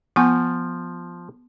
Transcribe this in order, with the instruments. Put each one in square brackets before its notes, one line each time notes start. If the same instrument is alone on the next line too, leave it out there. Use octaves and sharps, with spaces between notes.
[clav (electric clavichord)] F3 [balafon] B3 G#5 C#6